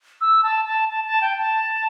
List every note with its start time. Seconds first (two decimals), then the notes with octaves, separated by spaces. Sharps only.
0.21 E6
0.43 A5
0.65 A5
0.89 A5
1.04 A5
1.22 G5
1.38 A5